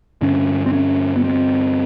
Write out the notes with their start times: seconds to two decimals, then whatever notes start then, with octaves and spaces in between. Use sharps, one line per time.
0.21 G2 D3 C#4
0.66 C4
0.73 C#4
1.16 B3
1.24 C4